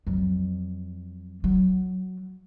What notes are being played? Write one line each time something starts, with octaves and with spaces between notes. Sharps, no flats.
F2 F#3
F#3